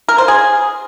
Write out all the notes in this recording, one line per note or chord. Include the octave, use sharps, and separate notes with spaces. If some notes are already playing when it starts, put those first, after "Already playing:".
A#4
C5
G#4